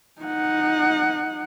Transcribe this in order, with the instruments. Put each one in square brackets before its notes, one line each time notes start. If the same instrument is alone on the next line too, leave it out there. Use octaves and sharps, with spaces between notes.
[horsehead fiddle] D#4 F#5